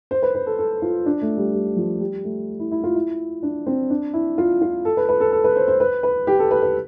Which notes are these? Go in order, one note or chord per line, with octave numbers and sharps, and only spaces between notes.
C5
B4
B4
A4
A4
F4
D4
A3
G3
G3
F3
G3
A3
E4
E4
F4
E4
D4
C4
D4
E4
F4
F4
A4
B4
B4
A4
A4
B4
C5
C5
B4
B4
G4
A4
B4
B4